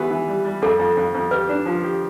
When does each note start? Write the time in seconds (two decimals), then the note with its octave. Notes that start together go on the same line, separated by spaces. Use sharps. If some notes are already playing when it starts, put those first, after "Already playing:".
Already playing: E3 B3 G4
0.11 E3
0.28 G3
0.45 G3
0.62 F2 A4
0.79 F2
0.97 F2
1.15 F2
1.31 G4 B4
1.49 D4
1.66 F3
1.84 G4